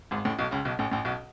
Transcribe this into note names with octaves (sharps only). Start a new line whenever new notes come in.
G#1 G#2
A1 A2
B1 B2
C#2 C#3
B1 B2
A1 A2
A1 A2
B1 B2